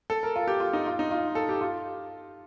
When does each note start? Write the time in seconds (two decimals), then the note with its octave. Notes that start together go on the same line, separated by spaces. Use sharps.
0.10 A4
0.23 A#4
0.36 F4
0.47 G4
0.60 F4
0.73 D#4
0.86 F4
0.99 D#4
1.11 F4
1.35 A4
1.49 G4
1.61 F4